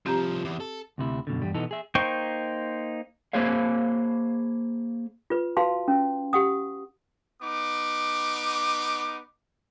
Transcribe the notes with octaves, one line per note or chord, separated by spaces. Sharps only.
C2 F3 C4 G4 A#5
E2
A4
D2 C3 E4
F#2 B2 D3
E2 G2 G3
B2 E3 B3 D#4 A4
G#4 E5
A#3 D#4 C5 G5 C#6
A#3 G#4 C5 C#5 F5
F4 B4
F#4 B4 F5 A5 C6
C#4
G4 F#5 D#6
B3 D#4 D6